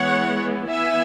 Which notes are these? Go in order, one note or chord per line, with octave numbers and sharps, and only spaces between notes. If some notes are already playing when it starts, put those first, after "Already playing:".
Already playing: E3 G#3 B3 C#5 F#5
E3 B3 E4 E5 G#5